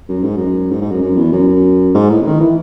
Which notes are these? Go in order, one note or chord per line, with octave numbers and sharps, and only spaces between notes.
F#2
G#2
F#2
G#2
G#2
F#2
F#2
E2
F#2
F#2
G#2
A2
C#3
D#3
E3